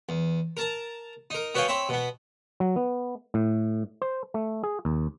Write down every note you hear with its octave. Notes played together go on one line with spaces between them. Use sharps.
E2
A#4 A5 A#5
D#4 A#4
B3 F#4 C#5 F5 G5 G#5
C4 C#5 E5 B5
B2 B3
F#3
B3
A2
C5
A3
G#4
D#2